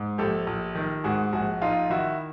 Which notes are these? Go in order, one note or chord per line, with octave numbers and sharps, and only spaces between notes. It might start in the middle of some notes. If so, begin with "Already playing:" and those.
Already playing: G#2
A#1 G4 A4
A#1
D#3
G#2 F#4 G#4
A#1 F#4 G#4
A#1 D#4 F4
D#3 E4 F#4